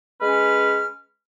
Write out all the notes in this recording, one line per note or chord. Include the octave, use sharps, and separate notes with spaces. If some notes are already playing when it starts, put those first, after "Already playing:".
G#3 C#4 B4 F6